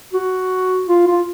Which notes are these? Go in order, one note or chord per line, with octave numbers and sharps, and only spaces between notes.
F#4
F4
F4